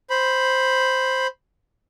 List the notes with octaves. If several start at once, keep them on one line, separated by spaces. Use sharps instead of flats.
C5 B5